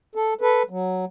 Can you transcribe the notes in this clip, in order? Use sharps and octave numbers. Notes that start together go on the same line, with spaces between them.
A4
A4 B4
F#3